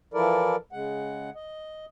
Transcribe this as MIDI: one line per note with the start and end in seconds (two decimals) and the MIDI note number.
0.14 0.56 52
0.14 0.56 53
0.14 0.56 64
0.14 0.56 69
0.14 0.56 70
0.14 0.56 74
0.72 1.30 49
0.72 1.30 56
0.72 1.30 78
1.35 1.86 75